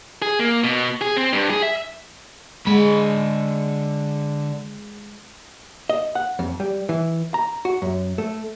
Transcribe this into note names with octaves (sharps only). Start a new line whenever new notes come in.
G#4
A#3
B2
G#4
C4
G2
G#4
E5
D3 G#3 B5
D#5
F#5
F2
G3
E3
A#5
F#4
F#2
A3